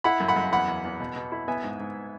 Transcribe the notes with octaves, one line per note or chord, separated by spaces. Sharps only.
E4 F#5 B5
F#2
F#5 B5
F#2
E2 F#5 B5
E2
E2
B2
B2
E4
B3 E5 G#5
G#2
G#2